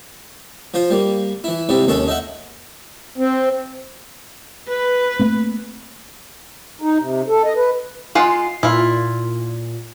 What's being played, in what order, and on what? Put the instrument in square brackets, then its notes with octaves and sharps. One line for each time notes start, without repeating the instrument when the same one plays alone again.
[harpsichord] F3 F4 C5
G3 A#3
E3 E4
G#2 C3 G3 E4
D#2 G#3 C#4 A4
D#4 E5 F#5
[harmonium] C4
[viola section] B4
[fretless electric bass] A3 A#3 C4
[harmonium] D#4
C3
A4
D#5
B4
[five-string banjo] G#3 F4 F#5 [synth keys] C7
[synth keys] A#2 [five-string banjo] E4 F4